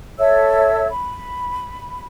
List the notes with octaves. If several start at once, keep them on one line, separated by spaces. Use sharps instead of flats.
A4 C#5 E5 E6
B5